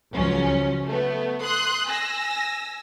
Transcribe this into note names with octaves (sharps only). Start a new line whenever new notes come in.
C#2 F3 F#3 C#4
A3 B3
C6 D#6 F#6
G#5 E6 A#6